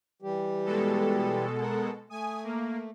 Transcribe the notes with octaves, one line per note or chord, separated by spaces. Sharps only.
E3 G3 G4
B2 G#3 A4
A#4 F#5
A3 G#5 D#6
A#3